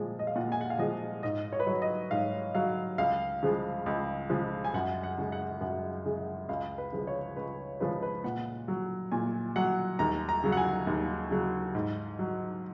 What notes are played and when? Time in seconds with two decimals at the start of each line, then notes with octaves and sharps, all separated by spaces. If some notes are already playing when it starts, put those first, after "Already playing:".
Already playing: A#2 F3 G#3
0.19 D#5
0.27 F5
0.36 A#2 F#5
0.52 G#5
0.61 F#5
0.70 F5
0.79 F3 G#3 D#5
1.23 G#2 D#5
1.53 C#5
1.60 B4
1.67 F#3 C#5
1.82 D#5
2.11 G#2 F5
2.55 F#3 F5
2.98 C#2 F5
3.43 C#3 F3 G#3
3.86 C#2
4.30 C#3 F3 G#3
4.64 G#5
4.74 F#2 F#5
5.04 F#5
5.18 C#3 G#3
5.32 F#5
5.61 F#2 F#5
6.05 C#3 G#3
6.49 C#2 F5
6.78 B4
6.92 C#3 F3 G#3
7.07 C#5
7.36 C#2 B4
7.80 C#3 F3 G#3 B4
8.03 B4
8.24 A#2 F#5
8.68 F#3
9.12 A#2 G#5
9.56 F#3 F#5
9.99 D#2 A#5
10.29 A#5
10.44 C#3 F#3
10.52 F#5
10.57 G#5
10.87 D#2
11.31 C#3 F#3
11.75 G#2
12.19 F#3